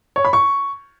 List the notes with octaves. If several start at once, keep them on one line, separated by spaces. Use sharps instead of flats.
C#5
B5
C#6